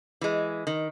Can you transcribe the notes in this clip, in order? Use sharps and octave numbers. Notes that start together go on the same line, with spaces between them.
E3 G#3
D#3